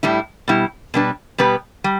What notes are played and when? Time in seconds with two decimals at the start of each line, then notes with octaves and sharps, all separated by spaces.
0.03 A2 G3 E4
0.48 B2 G3 E4
0.94 B2 G3 D4 B4
1.38 B2 G3 B3 G4 B4
1.84 G3